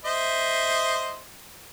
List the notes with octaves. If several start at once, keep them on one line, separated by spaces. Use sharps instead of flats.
C5 D#5 E5